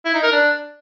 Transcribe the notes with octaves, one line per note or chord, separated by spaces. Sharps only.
E4
D#4
A#4
D4